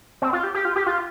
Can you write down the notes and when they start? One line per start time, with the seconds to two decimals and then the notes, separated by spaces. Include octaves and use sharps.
0.22 C4
0.33 F4
0.44 G4
0.54 G4
0.65 F4
0.76 G4
0.86 F4